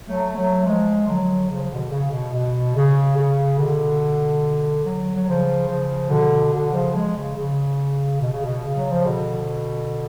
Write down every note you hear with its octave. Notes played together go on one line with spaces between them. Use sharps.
F#3 A3
F#3 A3
F3 G#3
D3 F#3
C#3 F3
F3
B2 D3
C#3
B2
B2
C#3
C#3
B2 D3
D3 F#3
F#3
C#3 F3
C#3 F3
B2 D3
B2 D3
C#3 F3
F3 G#3
C#3
C#3
B2
C#3
B2
C#3
F#3
F3
B2 D3